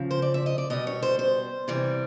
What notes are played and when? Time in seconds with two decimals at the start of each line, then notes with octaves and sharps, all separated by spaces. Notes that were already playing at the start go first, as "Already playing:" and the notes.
Already playing: C#3 F3
0.11 C5
0.22 D5
0.34 E5
0.46 D#5
0.58 D5
0.70 B2 G3 D#5
0.87 C#5
1.02 C5
1.19 C5
1.68 C3 E3 G3